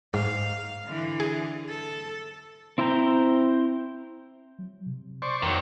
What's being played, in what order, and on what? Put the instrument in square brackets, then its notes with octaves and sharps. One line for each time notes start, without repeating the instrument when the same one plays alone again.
[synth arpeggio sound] G#2 [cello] F5
[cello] D3 E3
[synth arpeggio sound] G#4
[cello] A4
[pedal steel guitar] C4 E4 C5 G5 A#5
[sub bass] F#3
C3
[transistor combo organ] C5 D5 C#6
[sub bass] F2 [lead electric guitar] D#3 F#3